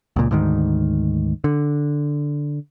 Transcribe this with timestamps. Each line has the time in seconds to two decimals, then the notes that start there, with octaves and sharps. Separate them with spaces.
0.16 C#2 A#2
0.31 D2 G#2 D#3
1.44 D3